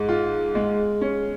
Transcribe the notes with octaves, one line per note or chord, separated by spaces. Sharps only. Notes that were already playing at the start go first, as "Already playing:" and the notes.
Already playing: G#2 G#4
F4
G#3
C#4